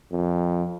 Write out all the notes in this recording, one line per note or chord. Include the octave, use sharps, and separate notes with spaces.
F2